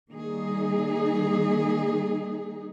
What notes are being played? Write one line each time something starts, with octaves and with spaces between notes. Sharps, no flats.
D#3 G3 A#3 D#4 G#4